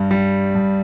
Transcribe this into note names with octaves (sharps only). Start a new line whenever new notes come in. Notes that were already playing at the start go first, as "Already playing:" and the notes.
Already playing: G2 G3
G3
G2